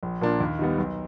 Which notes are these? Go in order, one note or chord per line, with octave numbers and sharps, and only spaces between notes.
A#1
A#2 F3 A#3 D4
D#2
D#3 G3 B3
B1